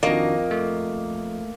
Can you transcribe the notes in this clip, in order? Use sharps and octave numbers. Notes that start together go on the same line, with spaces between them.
F2 D#3 A#3 D4 F#4 D#5
A3